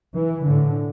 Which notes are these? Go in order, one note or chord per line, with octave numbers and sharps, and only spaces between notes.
E3
A2 D3